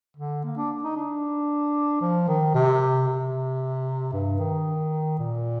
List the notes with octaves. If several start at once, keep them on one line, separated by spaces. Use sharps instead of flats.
D3
A#3
D4
D#4
D4
F3
D#3
C3
C3
G2
D#3
A#2